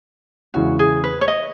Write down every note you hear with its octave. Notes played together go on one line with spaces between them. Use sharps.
E2 C#3 E3 G#3 F#4
G#4
B4
C#5
D#5